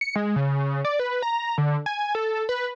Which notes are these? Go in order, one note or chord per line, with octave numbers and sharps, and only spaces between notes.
C#7
G#3
C#3
D5
B4
A#5
D3
G#5
A4
B4